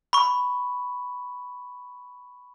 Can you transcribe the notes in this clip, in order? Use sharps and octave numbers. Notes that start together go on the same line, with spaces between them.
B5 C#6